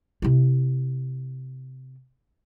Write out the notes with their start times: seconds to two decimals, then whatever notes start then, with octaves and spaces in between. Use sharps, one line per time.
0.22 C3 E4